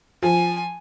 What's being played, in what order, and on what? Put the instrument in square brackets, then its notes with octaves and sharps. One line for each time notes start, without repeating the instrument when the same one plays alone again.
[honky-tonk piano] F3 [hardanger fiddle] G#5